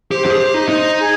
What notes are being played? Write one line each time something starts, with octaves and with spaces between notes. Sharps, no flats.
G4 C5
G4
G#4
G4
D#4
D#4 C5
G#4